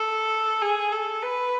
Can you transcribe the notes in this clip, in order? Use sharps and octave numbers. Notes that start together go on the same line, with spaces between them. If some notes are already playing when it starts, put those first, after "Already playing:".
Already playing: A4
G#4
A4
B4